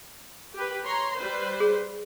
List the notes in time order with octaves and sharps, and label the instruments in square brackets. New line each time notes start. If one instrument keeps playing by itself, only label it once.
[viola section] G4 B4
C#5 A#5 C6
G3 B4 C5
[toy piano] G#4